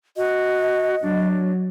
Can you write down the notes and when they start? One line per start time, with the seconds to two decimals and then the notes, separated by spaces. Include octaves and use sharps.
0.17 F#4 D#5
1.02 F#3 D4